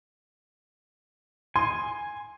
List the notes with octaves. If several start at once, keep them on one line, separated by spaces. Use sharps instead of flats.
G#5 C6